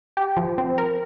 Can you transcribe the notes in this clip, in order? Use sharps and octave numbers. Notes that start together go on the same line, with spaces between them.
G4
F3
C4
A#4